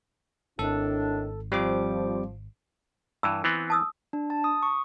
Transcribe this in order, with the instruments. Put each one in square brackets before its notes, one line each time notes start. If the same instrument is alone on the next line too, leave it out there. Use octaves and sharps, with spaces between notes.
[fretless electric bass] G#1 [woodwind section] A2 D#3 D4 [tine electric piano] A4
[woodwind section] F3 [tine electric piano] G3 C4 D6
[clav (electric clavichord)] G2 E3 [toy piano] E6
[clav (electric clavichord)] E3 B3 C4
[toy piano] A5 D#6 E6
[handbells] D4
A5
D#6
C#6